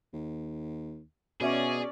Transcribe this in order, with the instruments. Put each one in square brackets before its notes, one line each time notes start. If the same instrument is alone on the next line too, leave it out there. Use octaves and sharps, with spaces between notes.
[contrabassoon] D#2
[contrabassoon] B2 [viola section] C#4 D5 [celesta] F#4 E5 [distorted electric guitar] G#4